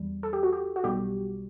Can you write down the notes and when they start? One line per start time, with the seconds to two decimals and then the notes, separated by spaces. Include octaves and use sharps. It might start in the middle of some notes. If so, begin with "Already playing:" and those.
Already playing: E2 G3
0.23 A4
0.33 G4
0.43 F#4
0.53 G4
0.76 F#4
0.84 B1 B2 G3 G4